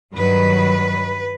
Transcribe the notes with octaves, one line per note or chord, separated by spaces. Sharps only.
G2 D#3 F#3 B4